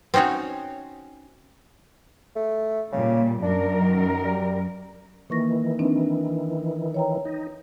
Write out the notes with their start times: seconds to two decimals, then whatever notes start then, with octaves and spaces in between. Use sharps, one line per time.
0.14 C4 C#4 D#4 F#4 C#5
2.36 A3
2.92 A#2 C#3 G3
3.42 F#2 D4 A#4
3.81 D#3
4.24 G3
5.30 D#3 E3 A#3 C#6 A#6
5.79 C4 D4 D#4
6.94 C#5 G5 A#5
7.25 D#4